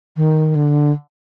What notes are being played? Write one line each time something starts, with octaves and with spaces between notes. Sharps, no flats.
D#3
D3